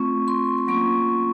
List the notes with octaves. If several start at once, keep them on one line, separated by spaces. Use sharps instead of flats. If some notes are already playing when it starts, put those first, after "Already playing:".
Already playing: A3 C4 F4 C#6
C6
C6
F#3 A#3 C#4 F4 C#6